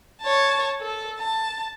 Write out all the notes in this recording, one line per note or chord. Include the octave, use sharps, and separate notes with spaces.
C#5 A5
A4
A5